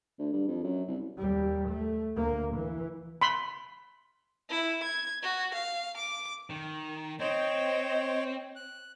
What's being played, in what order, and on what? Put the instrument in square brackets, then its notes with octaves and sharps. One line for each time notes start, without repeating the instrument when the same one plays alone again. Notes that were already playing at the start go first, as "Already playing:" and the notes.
[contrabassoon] D2
G2
F2
F#2
C2
[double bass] D#2 G3
A3
D2 A#3
E3
[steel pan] B5 C6
[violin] E4
G#6
F#4
F5
D6
[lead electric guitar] D#3
[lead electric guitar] C4 [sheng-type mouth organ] C5 C#5 G5 [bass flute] D#5
[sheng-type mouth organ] F#6